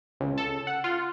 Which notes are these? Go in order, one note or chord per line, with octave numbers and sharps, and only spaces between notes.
C#2
A4
F#5
F4